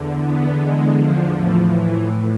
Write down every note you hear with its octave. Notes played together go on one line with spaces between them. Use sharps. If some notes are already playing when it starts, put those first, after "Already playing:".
Already playing: E2 D3
B3
G#3
F3
A2 E3 F3
E3